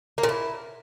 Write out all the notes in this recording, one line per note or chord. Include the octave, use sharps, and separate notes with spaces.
A#3
A#2
E4